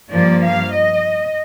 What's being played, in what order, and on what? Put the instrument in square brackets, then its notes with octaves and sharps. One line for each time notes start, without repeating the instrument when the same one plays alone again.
[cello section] G2 F3 A#3 D5
F5
D#5